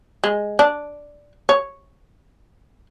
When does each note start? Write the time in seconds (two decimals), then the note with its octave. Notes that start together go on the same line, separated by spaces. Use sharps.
0.24 G#3
0.59 D4
1.49 C#5